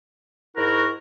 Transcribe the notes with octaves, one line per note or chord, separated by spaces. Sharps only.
G#2 E4 F#4 A#4